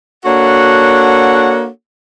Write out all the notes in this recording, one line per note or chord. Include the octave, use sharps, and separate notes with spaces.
A#3 D4 F#4 A4 C#5 F#5